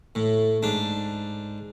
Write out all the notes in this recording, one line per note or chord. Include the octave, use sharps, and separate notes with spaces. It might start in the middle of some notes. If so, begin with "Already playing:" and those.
A2
G#2 D4